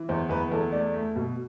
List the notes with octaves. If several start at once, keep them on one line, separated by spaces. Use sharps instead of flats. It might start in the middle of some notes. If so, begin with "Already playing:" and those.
Already playing: E3
E2 C5
E2 B4
E2 A4
A3 D5
A3
B2